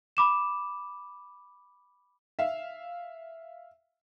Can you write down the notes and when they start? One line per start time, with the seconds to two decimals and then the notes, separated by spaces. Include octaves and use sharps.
0.17 B5 D6 E7
2.39 E5 F5